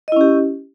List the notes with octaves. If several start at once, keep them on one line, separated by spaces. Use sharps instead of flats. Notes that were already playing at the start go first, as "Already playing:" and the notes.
C#4 E4 G4 D#5